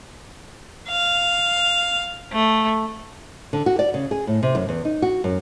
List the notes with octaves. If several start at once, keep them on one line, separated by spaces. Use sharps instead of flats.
F5
A3
D3
F#4
D5
C#3
G#4
A2
C3
F#2
E2
D#4
F#4
F#2